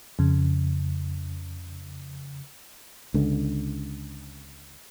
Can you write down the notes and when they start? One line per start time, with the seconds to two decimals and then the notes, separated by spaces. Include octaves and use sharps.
0.19 F2 C#3
3.14 C#2 D3